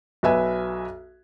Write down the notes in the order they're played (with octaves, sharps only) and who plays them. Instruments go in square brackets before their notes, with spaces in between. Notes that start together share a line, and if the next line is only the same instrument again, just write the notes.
[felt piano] B1 B4 E5 G#5